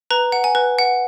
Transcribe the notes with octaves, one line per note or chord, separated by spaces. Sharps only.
B4 A#5
F#5
G#5
B4
F#5